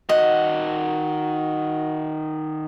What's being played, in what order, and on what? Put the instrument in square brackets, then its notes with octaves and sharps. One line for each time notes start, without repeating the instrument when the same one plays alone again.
[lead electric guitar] D#3 F#5 [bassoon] F#4 [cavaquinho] D#5